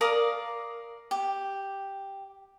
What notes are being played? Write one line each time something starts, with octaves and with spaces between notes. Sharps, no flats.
A#4 D5 F5 D#6
G4